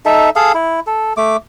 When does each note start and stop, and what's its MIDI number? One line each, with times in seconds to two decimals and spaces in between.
0.05 0.30 63
0.05 0.30 69
0.05 0.30 76
0.36 0.52 68
0.36 0.52 69
0.36 0.52 77
0.54 0.80 64
0.87 1.13 69
1.17 1.36 57
1.17 1.36 86